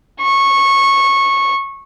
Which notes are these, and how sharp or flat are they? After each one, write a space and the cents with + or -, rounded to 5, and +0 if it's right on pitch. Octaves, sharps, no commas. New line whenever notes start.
C#6 -15